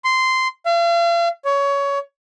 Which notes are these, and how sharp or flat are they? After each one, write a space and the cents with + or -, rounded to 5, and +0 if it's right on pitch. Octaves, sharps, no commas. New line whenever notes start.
C6 -10
F5 -40
C#5 +20